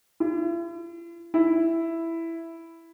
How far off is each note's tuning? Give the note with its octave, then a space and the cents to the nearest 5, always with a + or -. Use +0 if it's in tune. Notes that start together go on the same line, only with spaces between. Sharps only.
E4 +45
E4 +5